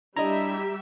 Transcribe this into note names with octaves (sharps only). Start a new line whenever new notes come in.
G3 D4 E4 G4 D#5 E5 A#5